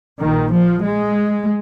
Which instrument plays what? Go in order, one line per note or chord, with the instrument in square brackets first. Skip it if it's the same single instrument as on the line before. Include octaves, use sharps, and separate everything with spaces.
[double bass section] A#1 A#2 D#3
F3
G#3